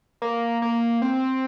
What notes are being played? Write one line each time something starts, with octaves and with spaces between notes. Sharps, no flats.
A#3
A#3
C4